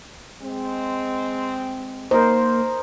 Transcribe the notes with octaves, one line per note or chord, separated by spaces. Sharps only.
G#3 C4
A#3 D#4 A#4 C5